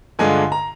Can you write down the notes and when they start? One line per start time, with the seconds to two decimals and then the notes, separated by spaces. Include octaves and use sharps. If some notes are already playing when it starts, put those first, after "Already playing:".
0.19 G2 D3 G#3 D4 F4 G#5
0.52 A#5